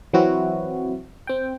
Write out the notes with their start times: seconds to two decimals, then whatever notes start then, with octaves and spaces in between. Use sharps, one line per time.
0.13 E3 F#3 C4 E4 F#4
1.27 C4 G5